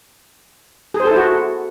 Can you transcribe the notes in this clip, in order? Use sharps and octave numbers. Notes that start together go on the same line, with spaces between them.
G#4
C5
A4
E4
F#4